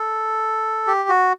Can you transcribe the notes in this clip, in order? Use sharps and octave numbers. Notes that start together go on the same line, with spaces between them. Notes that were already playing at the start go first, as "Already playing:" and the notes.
Already playing: A4
G4
F#4